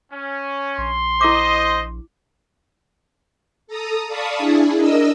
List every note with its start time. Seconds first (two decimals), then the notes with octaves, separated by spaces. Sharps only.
0.13 C#4
0.78 A#1 C6
1.21 E4 C5 D#5 D6
3.67 A4 A#5 D#6
4.07 D5 F5 A5 B5 C#6 D#6
4.38 D4 E4 G#4
4.75 D4 A#4 D#5 E6